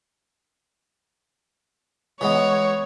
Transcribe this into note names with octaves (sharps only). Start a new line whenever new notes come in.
E3 G#3 B3 C#5